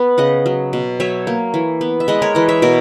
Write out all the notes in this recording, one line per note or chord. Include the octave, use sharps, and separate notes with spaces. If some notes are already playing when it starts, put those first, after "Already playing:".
Already playing: B3 B4
C#3 D#5 F#5
F#3
B2
F#3 C#5 E5
A#3
E3
B3
E5
G#3 B4 D#5
A#4 C#5
E3 B4 D#5
C#5 E5
B2 A#4 C#5